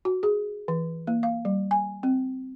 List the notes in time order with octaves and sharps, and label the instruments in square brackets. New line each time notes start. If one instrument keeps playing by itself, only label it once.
[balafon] F#4
G#4
E3
A#3
F5
G3
G#5
C4